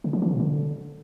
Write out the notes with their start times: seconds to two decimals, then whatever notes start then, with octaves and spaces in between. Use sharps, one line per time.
0.04 C#3
0.13 F3
0.22 E3
0.31 B2
0.40 D3